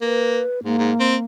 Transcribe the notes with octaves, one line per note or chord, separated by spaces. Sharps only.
A#3 B4
G#2 A#3
G#2
C4